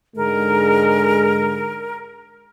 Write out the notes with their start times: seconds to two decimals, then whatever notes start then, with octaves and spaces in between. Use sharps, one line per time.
0.16 G#2 D3 G#3 A#4